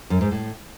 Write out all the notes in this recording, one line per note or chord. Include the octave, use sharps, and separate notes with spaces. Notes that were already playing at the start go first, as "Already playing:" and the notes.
F#2
G#2
A2